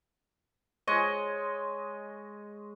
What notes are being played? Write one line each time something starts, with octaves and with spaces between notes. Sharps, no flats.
G#3 C#5 D#5